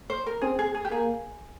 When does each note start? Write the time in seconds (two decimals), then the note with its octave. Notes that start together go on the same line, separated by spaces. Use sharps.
0.10 C5
0.26 A#4
0.41 C4 G#4
0.59 G#4
0.75 G#4
0.85 G4
0.91 A#3 G#4